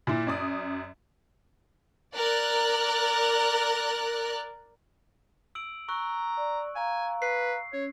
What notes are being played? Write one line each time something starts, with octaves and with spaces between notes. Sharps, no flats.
A#2 E4
F#2 D5 D#6
A#4 D5 F#6
E6 D7 F#7
A#5 C#6 E6 F#6
D5
F5 G#5 A#5
B4 C7
C#4 C#5